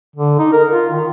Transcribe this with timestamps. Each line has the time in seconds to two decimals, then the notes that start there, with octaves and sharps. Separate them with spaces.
0.16 D3
0.39 D#4
0.52 A#4
0.71 F4
0.90 D#3